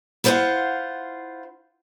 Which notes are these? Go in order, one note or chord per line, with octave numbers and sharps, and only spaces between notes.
E4 F4 C5 D#5 F5 F#5